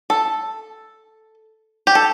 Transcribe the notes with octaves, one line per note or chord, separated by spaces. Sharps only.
A4
G4
A4